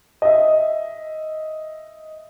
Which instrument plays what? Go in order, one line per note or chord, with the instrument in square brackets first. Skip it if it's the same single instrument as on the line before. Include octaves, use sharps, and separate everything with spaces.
[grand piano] D#5 E5